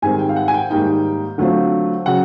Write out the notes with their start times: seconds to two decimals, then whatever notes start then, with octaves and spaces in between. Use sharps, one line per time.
0.02 G#2 D#3 G3 C4 G#5
0.19 G5
0.29 F5
0.36 F#5
0.48 G#5
0.54 G5
0.70 G#2 D#3 G3 A#3 D#4 G5
1.38 D3 F#3 A3 C4 F4
2.06 C#3 F#3 F#5